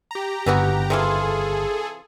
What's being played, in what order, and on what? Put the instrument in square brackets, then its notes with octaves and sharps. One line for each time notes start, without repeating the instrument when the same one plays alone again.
[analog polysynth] G4 A#5
[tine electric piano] G1 [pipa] E3 B3 F#4
[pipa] C3 E3 F4 [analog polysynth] G#4 A4